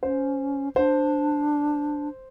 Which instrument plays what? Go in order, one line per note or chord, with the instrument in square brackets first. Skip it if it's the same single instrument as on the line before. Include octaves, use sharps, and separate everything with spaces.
[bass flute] C#4 [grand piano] C5
[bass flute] D4 [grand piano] C5